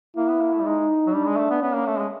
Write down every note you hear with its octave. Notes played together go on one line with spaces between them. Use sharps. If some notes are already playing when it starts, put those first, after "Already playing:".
A#3 E4
B3
A#3
A3
G3
G#3 D#4
F#3
G3 D4
G#3
A3
B3
B3 C#4
A#3
A3
G#3